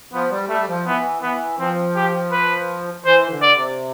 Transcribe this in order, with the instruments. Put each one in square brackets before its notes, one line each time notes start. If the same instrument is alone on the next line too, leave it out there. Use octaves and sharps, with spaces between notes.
[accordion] F3 [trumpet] B3
[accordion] G3
[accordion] G3 [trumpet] A3
[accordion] F3
[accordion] E3 [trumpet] B3
[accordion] E3 [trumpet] B3
[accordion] F3 [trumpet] C4
[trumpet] G4
B4
[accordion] E3 [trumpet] C5
[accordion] D3
[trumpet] D5
[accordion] C3